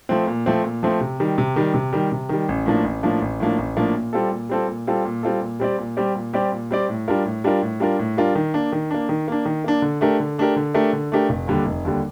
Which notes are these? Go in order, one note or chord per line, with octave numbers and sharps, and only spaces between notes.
F3 A3 C4
A#2
F3 A3 C4
A#2
F3 A3 C4
C3
D#3 G3
C3
D#3 G3
C3
D#3 G3
C3
D#3 G3
A1
A2 F3 A#3 D4
A1
A2 F3 A#3 D4
A1
A2 F3 A#3 D4
A1
A2 F3 A#3 D4
A#2
G3 C4 F4 A4
A#2
G3 C4 F4 A4
A#2
G3 C4 F4 A4
A#2
G3 C4 F4 A4
A#2
G3 C4 G4 D5
A#2
G3 C4 G4 D5
A#2
G3 C4 G4 D5
A#2
G3 C4 G4 D5
A2
G3 D4 F4 A#4
A2
G3 D4 F4 A#4
A2
G3 D4 F4 A#4
A2
G3 D4 F4 A#4
D#3
A#3 D4
D#3
A#3 D4
D#3
A#3 D4
D#3
A#3 D4
D3
A3 D4 G4 A#4
D3
A3 D4 G4 A#4
D3
A3 D4 G4 A#4
D3
A3 D4 G4 A#4
F1
D#2 D3 G3
F1
D#2 D3 G3